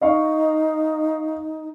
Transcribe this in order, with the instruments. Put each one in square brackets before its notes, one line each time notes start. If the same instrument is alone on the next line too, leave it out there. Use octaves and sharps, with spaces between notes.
[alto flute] D#4 [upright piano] D#5 F5 C#6